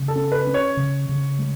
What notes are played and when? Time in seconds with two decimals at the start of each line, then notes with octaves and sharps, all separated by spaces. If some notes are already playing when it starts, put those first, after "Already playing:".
Already playing: C#3
0.08 A4
0.16 C#4
0.32 B4
0.47 C#4
0.54 C#5
0.77 C#3
1.09 C#3
1.39 G#3